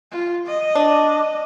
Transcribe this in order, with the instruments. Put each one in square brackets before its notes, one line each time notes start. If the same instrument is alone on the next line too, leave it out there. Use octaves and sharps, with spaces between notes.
[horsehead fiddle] F4
D#5
[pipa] D4